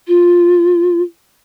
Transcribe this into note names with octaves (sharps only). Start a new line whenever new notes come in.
F4